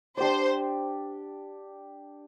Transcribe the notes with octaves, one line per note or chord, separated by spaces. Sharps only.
D4 G4 C5 D5